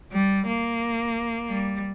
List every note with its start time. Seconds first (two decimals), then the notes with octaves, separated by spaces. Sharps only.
0.12 G3
0.47 A#3
1.49 G3